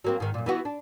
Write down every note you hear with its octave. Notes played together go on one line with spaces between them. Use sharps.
F#3 A#3 C4
G#2 D#3
F#2 A#2
E3 B3 F#4
D4